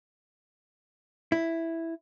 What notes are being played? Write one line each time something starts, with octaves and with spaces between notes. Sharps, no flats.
E4